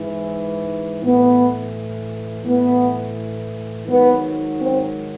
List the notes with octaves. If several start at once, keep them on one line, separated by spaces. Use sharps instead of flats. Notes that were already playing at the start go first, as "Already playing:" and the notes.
Already playing: G#2 E3
A2 E3 B3
A2 E3 B3
G#2 D#3 F#3 B3
C4